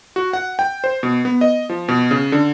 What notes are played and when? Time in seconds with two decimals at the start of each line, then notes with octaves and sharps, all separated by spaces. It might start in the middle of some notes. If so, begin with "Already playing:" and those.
0.16 F#4
0.33 F#5
0.59 G5
0.84 C5
1.03 B2
1.25 B3
1.41 D#5
1.69 F3
1.88 B2
2.11 C#3
2.32 D3